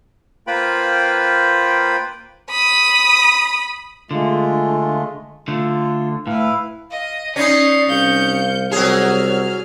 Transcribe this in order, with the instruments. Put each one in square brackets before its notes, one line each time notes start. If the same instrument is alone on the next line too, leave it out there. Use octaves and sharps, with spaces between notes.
[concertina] A#3 F4 B4 C5 G5 B5
[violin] B5 D#6
[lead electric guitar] D3 [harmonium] G#3 A3 F4
[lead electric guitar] D3 A3 [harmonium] F4
[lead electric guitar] A2 [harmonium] E4 B4 F5
[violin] D#5 [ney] F5
[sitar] C#4 D#4 [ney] D5 [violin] C7
[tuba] C2 [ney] F5 [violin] G6 C#7
[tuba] C2 [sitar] F#3 G#4 [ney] C#5 [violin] F6